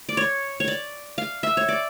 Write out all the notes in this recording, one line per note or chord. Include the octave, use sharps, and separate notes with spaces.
D5
C#5
C#5
D5
F5
E5
C#5
D5